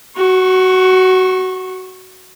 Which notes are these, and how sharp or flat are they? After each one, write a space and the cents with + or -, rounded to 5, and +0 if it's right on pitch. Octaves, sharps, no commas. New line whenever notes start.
F#4 +15 C#6 -25